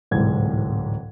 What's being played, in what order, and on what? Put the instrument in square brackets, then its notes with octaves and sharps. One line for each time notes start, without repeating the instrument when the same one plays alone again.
[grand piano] D1 C2 G#2 E3 G#3 G#6